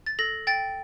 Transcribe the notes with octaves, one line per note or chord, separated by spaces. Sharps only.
A6
A4 A#6
G5 A6